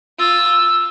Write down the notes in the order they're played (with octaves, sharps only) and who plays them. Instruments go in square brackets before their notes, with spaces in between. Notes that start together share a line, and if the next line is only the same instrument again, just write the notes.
[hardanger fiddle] F4 [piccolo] E6